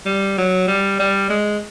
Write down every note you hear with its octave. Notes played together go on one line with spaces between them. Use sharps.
G3
F#3
G3
G3
G#3